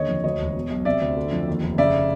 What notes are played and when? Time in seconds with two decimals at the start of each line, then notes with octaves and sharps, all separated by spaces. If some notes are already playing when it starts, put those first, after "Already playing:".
Already playing: D#2 D3 C#5 D#5
0.08 F2
0.24 D2 C#5 D#5
0.39 E1
0.55 B2
0.70 B1
0.85 C3 D5 E5
1.01 D2
1.17 D3
1.32 F2
1.47 D#2
1.63 F1
1.78 C#3 D5 E5